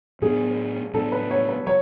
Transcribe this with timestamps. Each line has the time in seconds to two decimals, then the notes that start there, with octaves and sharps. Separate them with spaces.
0.22 A2 F#3 B3 D4 G#4
0.94 A2 F#3 B3 D4 A4
1.12 B4
1.31 C#5
1.49 B4
1.67 F#3 C#5